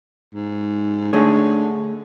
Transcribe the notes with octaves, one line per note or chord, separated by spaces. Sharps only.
G#2
D3 A3 G#4 C#5